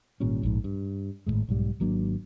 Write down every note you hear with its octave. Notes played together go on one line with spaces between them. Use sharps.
G#1 A#2 G3 C#4
A#1 G#2
G2
G#1 F2 A2 G#3
B1 G#2 G3
G#1 F#3 A#3 D4